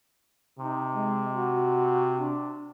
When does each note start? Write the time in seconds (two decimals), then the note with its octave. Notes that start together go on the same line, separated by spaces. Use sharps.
0.59 C3 D#4
0.93 G#3
1.33 F#4
2.16 D4